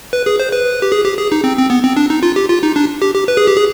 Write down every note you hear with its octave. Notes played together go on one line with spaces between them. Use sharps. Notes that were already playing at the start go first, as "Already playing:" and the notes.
B4
G#4
C5
B4
G4
G#4
G4
G#4
D#4
C4
C4
B3
C4
D4
D#4
F4
G4
F4
D#4
D4
G4
G4
B4
G#4
G4
G#4